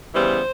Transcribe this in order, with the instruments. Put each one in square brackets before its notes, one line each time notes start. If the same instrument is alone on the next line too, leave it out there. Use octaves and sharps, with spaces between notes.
[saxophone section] C#3 E3 G3 B3 C5